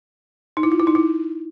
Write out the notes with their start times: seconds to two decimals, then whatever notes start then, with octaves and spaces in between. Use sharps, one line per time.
0.57 D#4
0.63 E4
0.72 F4
0.79 E4
0.87 D#4
0.95 E4